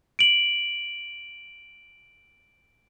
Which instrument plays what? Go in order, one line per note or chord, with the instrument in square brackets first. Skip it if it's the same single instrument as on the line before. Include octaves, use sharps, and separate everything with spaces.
[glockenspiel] D7 F#7